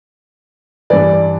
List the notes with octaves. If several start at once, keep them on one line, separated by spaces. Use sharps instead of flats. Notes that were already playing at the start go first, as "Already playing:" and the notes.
G2 E3 D5